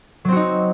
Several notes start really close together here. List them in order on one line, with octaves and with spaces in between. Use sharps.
F#3 C4 F#4 D#4